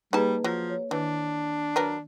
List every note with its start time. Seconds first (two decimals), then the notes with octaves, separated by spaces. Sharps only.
0.13 G3 A#3 D#4 G#4 B4 A5
0.44 F3 F#3
0.70 C#5
0.91 D#3 E3 D4
1.76 F#3 A#4 B4